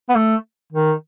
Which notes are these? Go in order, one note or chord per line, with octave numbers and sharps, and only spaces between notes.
B3
A3
D#3